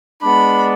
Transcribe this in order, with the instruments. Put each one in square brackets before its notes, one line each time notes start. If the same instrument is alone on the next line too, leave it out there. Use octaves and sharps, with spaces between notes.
[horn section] G#3 B3 D4 [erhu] B5